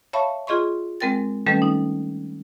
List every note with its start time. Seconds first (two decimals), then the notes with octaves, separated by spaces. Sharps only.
0.13 C#5 E5 F5 A5 B5 C#6
0.47 F4 G#4 D#5 C6 C#6
1.00 G#3 C4 A#4 G5 A6
1.46 D#3 G3 A3 C#4 A4 B4
1.62 D#4